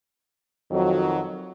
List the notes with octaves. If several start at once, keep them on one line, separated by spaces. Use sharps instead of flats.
F2 D#3 F#3